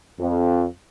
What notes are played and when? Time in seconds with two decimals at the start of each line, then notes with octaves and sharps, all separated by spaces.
0.20 F2